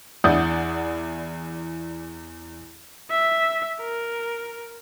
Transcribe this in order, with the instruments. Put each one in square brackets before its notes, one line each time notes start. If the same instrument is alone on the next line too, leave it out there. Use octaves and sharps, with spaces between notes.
[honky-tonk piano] E2 E4 D5 F#5 D#6 G6
[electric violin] E5
A#4